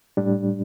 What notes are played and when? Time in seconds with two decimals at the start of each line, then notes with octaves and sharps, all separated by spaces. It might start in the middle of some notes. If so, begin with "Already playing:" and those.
0.17 A2 G3 D4